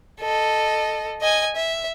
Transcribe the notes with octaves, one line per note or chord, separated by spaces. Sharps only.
A4 D#5
D#5 G#5
E5